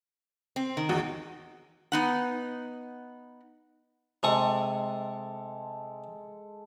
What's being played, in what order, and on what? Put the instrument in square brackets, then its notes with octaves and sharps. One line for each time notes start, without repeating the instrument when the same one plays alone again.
[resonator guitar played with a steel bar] C4
D#3
[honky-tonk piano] A1 E2 F#4
[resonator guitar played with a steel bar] B3 D#4 F#5
[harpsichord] C3 C#6 D#6 [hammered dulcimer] G#3 A4